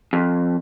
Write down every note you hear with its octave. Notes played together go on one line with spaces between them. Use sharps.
F2